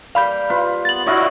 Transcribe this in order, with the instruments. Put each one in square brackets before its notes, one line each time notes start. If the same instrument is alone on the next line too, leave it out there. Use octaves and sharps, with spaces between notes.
[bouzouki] E3 G3 A#3 [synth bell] F5 B5 G6
[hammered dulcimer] F4 B4
[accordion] B3 [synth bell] A6 F#7
[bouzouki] D4 [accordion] E4 F#4 [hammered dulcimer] C#5 D#5 F5